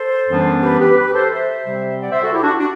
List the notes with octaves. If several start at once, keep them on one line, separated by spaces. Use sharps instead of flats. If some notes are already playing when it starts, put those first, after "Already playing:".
Already playing: A4 C5
F#2 E3 G3 B3 D4
G4 B4
G4 B4
G4 B4
A4 C5
C5 E5
C3 G3 C4
D5 F#5
C5 E5
F#4 A4
E4 G4
D4 F#4
D4 F#4